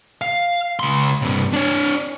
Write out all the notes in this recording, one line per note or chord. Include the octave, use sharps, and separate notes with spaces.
F5
C#2 C6
G2 C3
D4 C#5